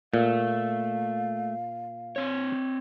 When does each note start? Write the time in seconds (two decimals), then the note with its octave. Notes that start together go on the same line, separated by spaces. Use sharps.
0.14 A#2 A3 F5
2.16 C4 C#5